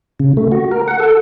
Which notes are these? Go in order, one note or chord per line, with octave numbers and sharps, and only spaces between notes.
C#3
A3
F#4
A#4
F#5
A4